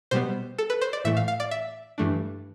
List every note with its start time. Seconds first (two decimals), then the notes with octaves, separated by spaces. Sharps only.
0.11 B2 G3 B3 C5
0.58 A4
0.70 B4
0.81 C5
0.93 D5
1.05 A2 E3 A3 E5
1.17 F5
1.28 F5
1.40 D5
1.51 E5
1.98 G2 E3 A3 D4